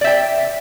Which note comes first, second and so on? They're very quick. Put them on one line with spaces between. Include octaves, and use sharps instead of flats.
D5 E5 G5